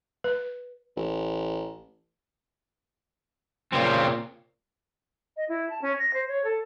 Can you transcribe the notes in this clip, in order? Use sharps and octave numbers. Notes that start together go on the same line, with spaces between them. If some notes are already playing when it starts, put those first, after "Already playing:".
B4
A1
A#2 C#3 C4
D#5
E4
A5
C#4
A#6
C5
C#5
A4